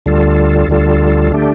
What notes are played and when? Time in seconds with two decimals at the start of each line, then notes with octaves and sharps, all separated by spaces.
0.06 D2 D3 G3 F4 A4
0.68 D2 D3 G3 F4 A4
1.32 D3 A3 D4 G4